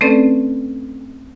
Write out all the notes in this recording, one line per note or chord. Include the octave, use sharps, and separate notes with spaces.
A3 C4 C#4 A4 B4 D5